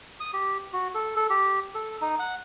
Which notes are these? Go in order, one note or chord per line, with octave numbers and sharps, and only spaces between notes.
D#6
G4
F#4
A4
A4
G4
A4
D#4
F#5